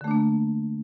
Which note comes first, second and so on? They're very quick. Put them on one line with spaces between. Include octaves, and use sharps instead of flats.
D3 A3 D4 A#3